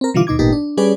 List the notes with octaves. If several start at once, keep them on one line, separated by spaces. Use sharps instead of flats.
C4 A#4
B2 D3 E3 G3 F4 D6
D#2 B2 D#4 D6 G#6
G#1 A#2 B3 D#4 G4
D4
G3 C#4 G#4 B4 D5